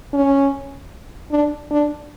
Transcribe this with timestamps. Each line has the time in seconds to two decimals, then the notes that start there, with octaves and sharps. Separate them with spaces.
0.14 C#4
1.31 D4
1.71 D4